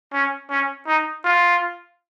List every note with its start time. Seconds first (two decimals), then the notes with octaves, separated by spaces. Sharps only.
0.13 C#4
0.50 C#4
0.87 D#4
1.24 F4